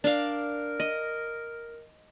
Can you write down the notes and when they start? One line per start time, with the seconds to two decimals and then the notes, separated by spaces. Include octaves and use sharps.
0.04 D4 A#4 F5
0.80 D#5